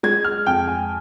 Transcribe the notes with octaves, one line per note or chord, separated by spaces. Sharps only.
G#3 G#6
F6
F2 G5
G#5